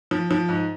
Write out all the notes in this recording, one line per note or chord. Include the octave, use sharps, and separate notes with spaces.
F3
F3
G#2